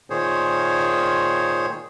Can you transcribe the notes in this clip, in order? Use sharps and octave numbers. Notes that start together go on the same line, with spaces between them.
A#2 D#3 G#4 C5 C#5